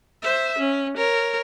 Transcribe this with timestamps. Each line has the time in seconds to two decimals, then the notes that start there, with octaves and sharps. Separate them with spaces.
0.22 C5 E5
0.58 C#4
0.97 A#4 C#5